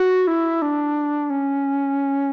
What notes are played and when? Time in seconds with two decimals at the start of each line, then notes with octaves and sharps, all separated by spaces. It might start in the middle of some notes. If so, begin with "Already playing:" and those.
Already playing: F#4
0.27 E4
0.62 D4
1.30 C#4